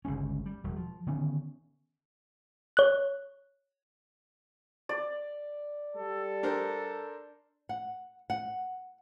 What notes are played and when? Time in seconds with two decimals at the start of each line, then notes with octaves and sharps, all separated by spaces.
0.05 G1 C#2 G#3 C#4
0.46 G3
0.64 E1
0.77 F3
1.07 D3 D#3 B3 C#4
2.77 C#5 F#6
4.89 D5
5.96 G3 A4
6.43 D4 A#4 C5
7.69 F#5
8.30 F#5